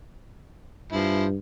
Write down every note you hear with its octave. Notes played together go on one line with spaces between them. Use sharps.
G2 F3 E4